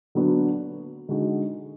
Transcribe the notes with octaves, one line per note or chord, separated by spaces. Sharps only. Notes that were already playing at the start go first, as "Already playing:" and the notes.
D3 F#3 B3 D4 F#4
D3 G#3 D#4 F#4